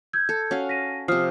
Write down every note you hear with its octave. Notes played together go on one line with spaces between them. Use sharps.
E6 G6 G#6
A4
C#4 F#4 F5
A#6 B6 D#7
C3 F3 D#6 F6 C7